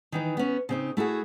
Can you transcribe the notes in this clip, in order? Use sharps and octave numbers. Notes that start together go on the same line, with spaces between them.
D#3 E3 D#4
B3 C#4
C#3 C4 D#4
A3 E4 F#4 G#4